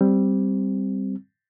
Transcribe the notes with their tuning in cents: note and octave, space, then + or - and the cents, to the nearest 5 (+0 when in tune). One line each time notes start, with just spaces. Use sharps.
G3 +0 C4 +0